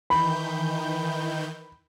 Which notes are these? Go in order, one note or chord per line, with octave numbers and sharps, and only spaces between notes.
D#3 E3 B5 G6